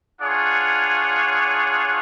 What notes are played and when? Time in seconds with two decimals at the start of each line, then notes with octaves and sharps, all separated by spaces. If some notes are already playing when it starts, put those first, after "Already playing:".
0.21 D4 F4 G#4 C#5 F#5